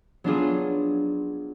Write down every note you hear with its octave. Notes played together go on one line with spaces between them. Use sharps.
F#3 B3 D4 F4 G#4